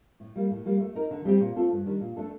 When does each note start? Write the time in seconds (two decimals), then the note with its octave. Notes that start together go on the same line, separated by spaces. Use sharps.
0.20 A2
0.36 G3 A#3
0.50 A2
0.66 G3 A#3
0.81 A3
0.95 D#4 A#4
1.11 D3
1.25 G3 C4 G4
1.40 A#2
1.56 A3 C4 F4 A4
1.72 G2
1.86 D#3 G3 D4
2.01 A#2
2.16 A3 D4 A4